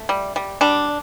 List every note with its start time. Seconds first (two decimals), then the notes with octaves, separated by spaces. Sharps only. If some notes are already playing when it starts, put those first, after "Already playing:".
Already playing: A3
0.09 G3
0.36 G3
0.61 G3 D4